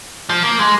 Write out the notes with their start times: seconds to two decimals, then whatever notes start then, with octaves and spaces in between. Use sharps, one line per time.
0.29 F3
0.43 A#3
0.59 G#3